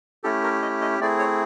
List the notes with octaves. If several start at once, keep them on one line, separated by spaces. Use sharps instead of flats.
A3 C#4 E4 G4 A4
A#4
D#5
D#5
A3 C4 E4 G#4 D5
C#5